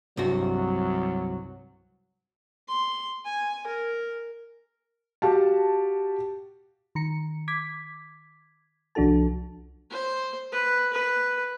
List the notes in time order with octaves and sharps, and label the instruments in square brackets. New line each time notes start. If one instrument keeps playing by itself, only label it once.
[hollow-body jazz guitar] C2 G2 F#4 [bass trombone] F#3
[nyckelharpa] C6
G#5
A#4
[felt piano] F#4 G4 F5 A5
[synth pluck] D#3 A#5 C#7
D6 G#6 B6
C2 F3 D4 F#4 A4 A5
[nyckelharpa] C5
B4
B4